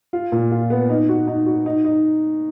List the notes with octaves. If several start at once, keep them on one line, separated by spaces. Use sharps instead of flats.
F4
A#2
F4
B3
D#4
F#4
D#4
F#4
D#4
D#4